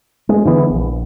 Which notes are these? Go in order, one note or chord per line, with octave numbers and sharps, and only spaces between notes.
G#3
D3 E3 B3
A#1